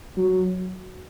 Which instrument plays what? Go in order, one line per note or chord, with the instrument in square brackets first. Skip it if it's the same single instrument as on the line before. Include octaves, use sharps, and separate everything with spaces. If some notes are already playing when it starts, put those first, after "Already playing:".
[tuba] F#3